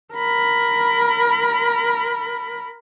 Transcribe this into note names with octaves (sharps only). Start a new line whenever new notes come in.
A#4 B5